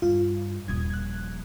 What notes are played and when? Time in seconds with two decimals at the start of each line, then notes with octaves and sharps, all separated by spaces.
0.02 G2 F4
0.68 D#1 F3 D#6 G#6
0.90 F#6 G#6